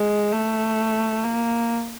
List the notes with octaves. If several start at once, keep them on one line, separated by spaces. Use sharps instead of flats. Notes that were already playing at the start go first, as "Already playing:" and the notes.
Already playing: G#3
A3
A#3